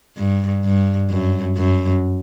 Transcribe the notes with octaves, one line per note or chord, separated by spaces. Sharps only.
G2
G2
F#2
F#2